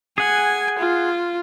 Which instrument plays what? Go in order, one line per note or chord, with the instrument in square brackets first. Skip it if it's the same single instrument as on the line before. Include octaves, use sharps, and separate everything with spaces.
[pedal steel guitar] G#4 F#5 [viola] G#5
[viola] F4